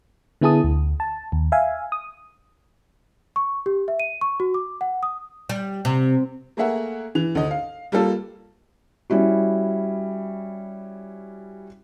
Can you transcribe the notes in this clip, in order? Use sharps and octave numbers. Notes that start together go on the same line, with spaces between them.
D3 B3 E4 G#4 A5 D#6
D2
A5
D#2
E5 F5 G#5
D#6
C#6
G4
E5
D#7
C#6
F#4
D6
F#5
D#6
G3
C3
A3 A#3 G#4 A#4 E5 F#5
E3 F7
D2 D#5
F5
G3 A#3 F4 A4
G3 C#4 E4 F#4